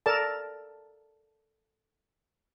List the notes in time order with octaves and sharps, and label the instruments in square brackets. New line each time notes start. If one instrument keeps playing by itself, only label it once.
[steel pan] A4 A#4 D5 A5